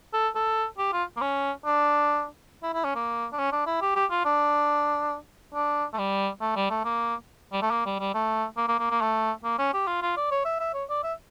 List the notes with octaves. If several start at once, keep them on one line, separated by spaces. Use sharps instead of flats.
A4
A4
G4
F4
A#3
C#4
D4
E4
E4
C#4
A#3
D4
C#4
D4
E4
G4
G4
F4
D4
D4
A3
G3
A3
G3
A3
A#3
G3
A3
A#3
G3
G3
A3
A#3
A#3
A#3
A#3
A3
A#3
C#4
G4
F4
F4
D5
C#5
E5
E5
C#5
D5
E5